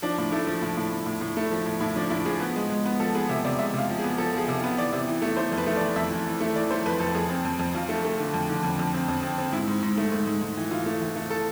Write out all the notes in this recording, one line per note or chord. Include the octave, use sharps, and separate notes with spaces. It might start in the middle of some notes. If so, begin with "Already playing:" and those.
F3 D4
A2
A3 E4
F3
A2
A2
A2
A2
A2
A3
F3
A2
A2 E4
F3 D4
A2 E4
F3 G#4
B3 B4
G#3
G#3
B3
F3 A4
B3 G#4
C3 E5
C3 D5
G#3 E5
C3 F5
F3
G#4
B3
F3 A4
F3 G#4
C3
F4
B3
E3 D5
C3
E3
A3
A3 C5
F2
B4
A3
E3 D5
F2 E5
E3
E3
A3
E3 D5
A3 C5
F2 B4
F2 A4
F2 G#4
C4
F2
F2
F2 F4
A3
A3
D3
F2
D3
F2
F2
C4
F2
C4
C4
G#2 E4
G#2
G#2
A3
G#2
G#2
G#2
E3
E3 F4
A3
E3
A3
A4